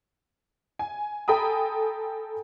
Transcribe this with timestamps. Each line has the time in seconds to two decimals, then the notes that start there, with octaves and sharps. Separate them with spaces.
0.79 G#5
1.28 A4 G5 G#5 A#5 B5 D#6